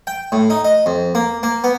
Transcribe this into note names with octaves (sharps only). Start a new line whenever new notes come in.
G5
A2
D#4
D#5
F2
A#3
A#3
B3